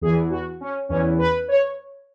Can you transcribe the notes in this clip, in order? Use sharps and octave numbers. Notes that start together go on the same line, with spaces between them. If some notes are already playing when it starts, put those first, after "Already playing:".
E2 E3 G#4
F#4
C#4
E2 E3 C#4
B4
C#5